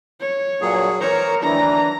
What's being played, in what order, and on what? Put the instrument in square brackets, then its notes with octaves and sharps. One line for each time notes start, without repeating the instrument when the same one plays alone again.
[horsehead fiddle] C#5
[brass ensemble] G2 A#2 [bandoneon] F#3 G#4
[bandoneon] E3 C5 A#5 [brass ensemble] A#4 [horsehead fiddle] C#5
[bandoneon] D2 D#3 [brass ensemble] E3 D4 [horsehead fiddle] A#5